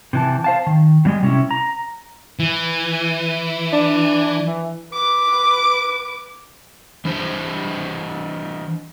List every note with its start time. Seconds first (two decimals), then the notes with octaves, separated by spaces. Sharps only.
0.13 C3 E3 A5
0.44 C5 F5 A5
0.67 D#3
1.05 A2 G3 G#3
1.23 C3 C#4 E4
1.51 A#5
2.39 E3
3.73 D4
4.46 E3
4.92 B4 D6
7.05 E3 D4 C5